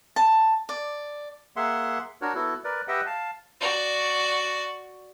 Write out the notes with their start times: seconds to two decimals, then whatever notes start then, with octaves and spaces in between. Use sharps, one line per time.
0.16 A5
0.69 D5
1.56 A#3 G#4 E5 F#5 C6
2.21 D4 F#4 A#4 C#5
2.35 B3 E4 F#4 A4
2.64 A#4 B4 D5
2.88 G4 B4 D#5 E5 F#5 G5
3.06 F5 A5
3.61 F#4 D5